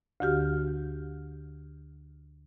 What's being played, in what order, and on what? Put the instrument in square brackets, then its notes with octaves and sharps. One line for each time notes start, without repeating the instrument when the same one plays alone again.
[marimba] D2 D3 F#4 G4 F6